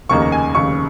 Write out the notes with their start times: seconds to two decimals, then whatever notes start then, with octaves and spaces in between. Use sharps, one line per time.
0.09 F1 D#2 C#3 A#3 D#4 C#6
0.22 A#5
0.32 G#5
0.55 F1 D#2 C#3 C#6